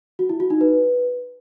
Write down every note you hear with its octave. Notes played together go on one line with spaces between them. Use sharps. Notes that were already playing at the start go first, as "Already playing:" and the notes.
F#4
E4
F#4
D#4
B4